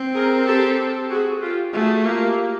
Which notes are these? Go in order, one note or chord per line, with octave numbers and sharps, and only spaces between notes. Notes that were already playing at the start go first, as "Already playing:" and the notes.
Already playing: C4
G#4 A#4
G4 A4
F#4 G#4
F4 G4
A3 F#4 G#4
A#3 F4 G4